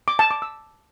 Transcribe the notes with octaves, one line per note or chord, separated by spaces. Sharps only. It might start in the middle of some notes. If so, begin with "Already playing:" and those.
D6
A5
D6
E6